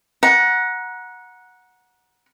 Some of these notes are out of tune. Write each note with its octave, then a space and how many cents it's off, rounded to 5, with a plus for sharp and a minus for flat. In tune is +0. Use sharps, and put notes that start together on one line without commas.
F#5 -10 A#5 +30